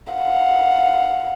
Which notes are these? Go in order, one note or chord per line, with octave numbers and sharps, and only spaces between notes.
F5 F#5